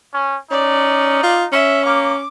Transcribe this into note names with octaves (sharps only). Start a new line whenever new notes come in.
C#4
C#4 D#4 D5
F4
C#4 E5
A#3 D6